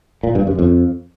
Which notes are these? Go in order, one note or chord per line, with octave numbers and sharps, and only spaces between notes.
A#2
G2
F#2
F2